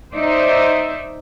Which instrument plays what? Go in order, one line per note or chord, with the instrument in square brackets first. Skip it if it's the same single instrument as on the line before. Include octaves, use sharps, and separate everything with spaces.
[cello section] D#4 C5 D5 E5